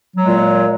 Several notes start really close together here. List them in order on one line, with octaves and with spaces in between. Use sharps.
F#3 G#3 A#2